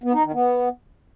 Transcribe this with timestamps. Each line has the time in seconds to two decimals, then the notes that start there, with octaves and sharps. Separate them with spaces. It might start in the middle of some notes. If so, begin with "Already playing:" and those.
0.03 B3
0.13 D#4
0.23 D#3
0.33 B3